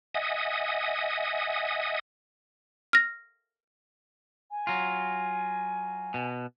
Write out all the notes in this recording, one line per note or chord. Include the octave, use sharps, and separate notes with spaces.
D#5 E5 F#5 G#5 D#6
F6 A#6
G#5
F#3 F4
B2